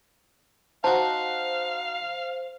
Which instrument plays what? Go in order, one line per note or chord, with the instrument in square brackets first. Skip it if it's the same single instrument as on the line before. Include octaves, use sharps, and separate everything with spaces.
[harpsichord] D#4 F#4 [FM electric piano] C5 [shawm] F5 [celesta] A5